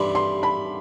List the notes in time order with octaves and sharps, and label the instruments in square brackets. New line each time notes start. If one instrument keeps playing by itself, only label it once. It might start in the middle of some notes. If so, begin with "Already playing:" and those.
Already playing: [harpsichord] G2 E3 G3 [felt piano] B5 C6
[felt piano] C6
B5